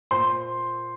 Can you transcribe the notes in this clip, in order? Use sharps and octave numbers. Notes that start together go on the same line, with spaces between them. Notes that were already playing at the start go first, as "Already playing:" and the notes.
A#2 C5 C6